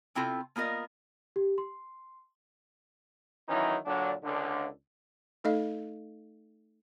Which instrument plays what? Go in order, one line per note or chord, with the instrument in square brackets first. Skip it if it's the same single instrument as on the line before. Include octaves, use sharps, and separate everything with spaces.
[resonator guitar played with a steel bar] C3 C4 E4 F4 A4
A#3 B3 F4 A#4 D#5
[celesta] G4
C6
[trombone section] D#3 E3 F#3 C#4 D#4 E4
A#2 D3 F#3 D4
C#2 D3
[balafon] A3 D#4 A4 D#5 F5